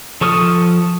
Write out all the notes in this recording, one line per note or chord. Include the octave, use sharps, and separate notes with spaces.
F3 A4 C#6 D#6 F6